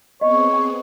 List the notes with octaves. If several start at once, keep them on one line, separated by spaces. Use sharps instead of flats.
B3 C4 G#4 C#5 D#5